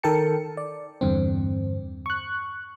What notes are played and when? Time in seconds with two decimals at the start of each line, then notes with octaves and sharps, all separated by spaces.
0.03 D#3 A4 A#4 G5 A5 C#7
0.57 D5
1.01 E2 G2 D3 C4
2.06 C#6 F#6